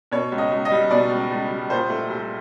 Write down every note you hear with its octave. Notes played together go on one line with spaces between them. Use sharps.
B2 C#5
C#2
D#5
C#2
D#5
G3
B2 D5
C#2
C#2
G3
A#2 C5
A3
C2